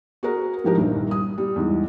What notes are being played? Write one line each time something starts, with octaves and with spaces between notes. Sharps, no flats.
F#4 G#4 A#4
G#2 F3 G4 A#4
C2 G2 A#2 D#3
D#6
G3
E2 G#2